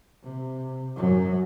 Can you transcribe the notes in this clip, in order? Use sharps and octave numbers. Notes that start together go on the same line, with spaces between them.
C3
F#2 F#3